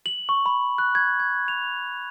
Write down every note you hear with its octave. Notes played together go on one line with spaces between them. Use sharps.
F#7
C#6
B5
F#6
G#6
G#6
F7